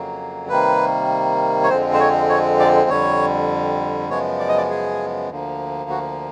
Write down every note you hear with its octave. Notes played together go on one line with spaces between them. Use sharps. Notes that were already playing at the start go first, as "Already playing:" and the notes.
Already playing: F2 C#3 F#3 A#3
C3 D#3 G3 A#3 B4
C#5
F2 D3 F3 G#3 C4 C5
C5
C#5
C#5
D5
F2 D3 G3 C#5
F#2 C#3 F3 G#3 B3 C#5
D5
D#5
D5
G#4
D2 D3 F3 A#3
F#4